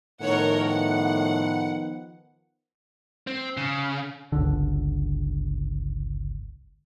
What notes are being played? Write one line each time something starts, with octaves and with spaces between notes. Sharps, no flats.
A2 D#3 F3 B3 A#4 C#5 F#5
F#5
C4
C#3
G1 C#2 D3